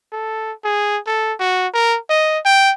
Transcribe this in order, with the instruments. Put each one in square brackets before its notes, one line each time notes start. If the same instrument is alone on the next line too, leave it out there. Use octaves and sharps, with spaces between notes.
[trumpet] A4
G#4
A4
F#4
A#4
D#5
G5